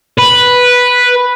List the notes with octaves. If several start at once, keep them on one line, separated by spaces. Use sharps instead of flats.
B4